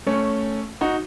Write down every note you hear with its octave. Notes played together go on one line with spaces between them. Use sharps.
A3 C#4
D#4 F#4